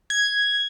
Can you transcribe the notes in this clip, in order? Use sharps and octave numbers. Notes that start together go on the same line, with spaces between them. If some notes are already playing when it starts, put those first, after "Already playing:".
G#6